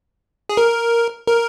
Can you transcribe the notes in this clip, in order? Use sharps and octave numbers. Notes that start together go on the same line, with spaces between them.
G#4
A#4
A#4